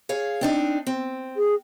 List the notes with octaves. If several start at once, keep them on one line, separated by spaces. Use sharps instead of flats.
G#4 C#5 F5
C4 D4 D#4
C4
G#4